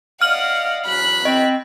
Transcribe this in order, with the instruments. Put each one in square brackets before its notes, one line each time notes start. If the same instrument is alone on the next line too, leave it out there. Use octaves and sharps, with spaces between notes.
[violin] D5 F#5 [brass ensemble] D#5 F5 [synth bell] F6 F#7
[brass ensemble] E2 F#3 [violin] B5 F#6
[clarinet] C4 [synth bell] D#5